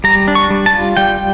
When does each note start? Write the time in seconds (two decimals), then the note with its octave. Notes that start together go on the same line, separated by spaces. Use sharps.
0.04 G3 A#5
0.28 D4
0.35 C#6
0.50 G3
0.66 A5
0.74 F4
0.97 G3 G5